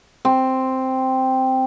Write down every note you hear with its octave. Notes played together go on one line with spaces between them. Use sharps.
C4